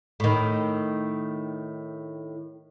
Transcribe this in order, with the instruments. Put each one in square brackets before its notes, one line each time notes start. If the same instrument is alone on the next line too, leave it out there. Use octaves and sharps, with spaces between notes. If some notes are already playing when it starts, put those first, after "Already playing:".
[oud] A2 D#3